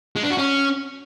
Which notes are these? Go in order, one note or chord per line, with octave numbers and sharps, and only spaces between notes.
G#3
D4
F#4
C#4